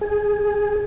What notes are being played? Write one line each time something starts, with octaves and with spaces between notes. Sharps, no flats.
G#4